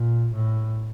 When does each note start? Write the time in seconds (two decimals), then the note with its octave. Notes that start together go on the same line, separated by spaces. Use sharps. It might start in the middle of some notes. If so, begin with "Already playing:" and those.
Already playing: A#2
0.32 A2